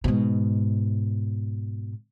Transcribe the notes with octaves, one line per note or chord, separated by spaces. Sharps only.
G#2 B2